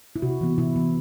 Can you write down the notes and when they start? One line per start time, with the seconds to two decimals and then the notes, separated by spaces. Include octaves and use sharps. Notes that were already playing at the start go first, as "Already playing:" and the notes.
0.16 E4
0.22 C3 F#4
0.41 E3 B3
0.58 C3 E4
0.76 E3 B3